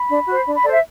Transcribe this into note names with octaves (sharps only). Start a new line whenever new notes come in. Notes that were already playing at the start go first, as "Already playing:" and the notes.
Already playing: B5
D4
F#4 C5
D4
B5
A4 C5 D5
E5